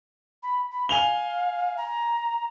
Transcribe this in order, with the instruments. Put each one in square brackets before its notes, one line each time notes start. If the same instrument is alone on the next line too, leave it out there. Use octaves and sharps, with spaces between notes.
[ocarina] B5
B5
[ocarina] F5 [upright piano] G#5 F7 G7
[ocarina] A#5